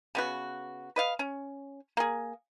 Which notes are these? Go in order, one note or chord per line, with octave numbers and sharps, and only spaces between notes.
C#3 B3 F#4
B4 D#5 F5
C#4
A#3 G#4